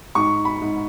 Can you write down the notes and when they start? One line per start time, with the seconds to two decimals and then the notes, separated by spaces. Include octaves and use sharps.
0.15 G#2 C#6
0.45 B5
0.61 G#2